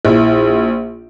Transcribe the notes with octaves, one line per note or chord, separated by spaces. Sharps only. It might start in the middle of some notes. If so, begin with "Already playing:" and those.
A#1 E4